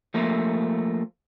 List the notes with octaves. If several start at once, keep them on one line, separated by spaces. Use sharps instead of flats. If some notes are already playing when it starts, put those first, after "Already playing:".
F3 A3 A#3